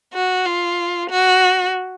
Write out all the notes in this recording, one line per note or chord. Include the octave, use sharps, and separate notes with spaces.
F#4
F4
F#4